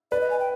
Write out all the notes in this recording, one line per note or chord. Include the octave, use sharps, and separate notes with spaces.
B4 D5
D#5
G#5
G5